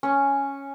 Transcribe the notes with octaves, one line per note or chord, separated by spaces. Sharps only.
C#4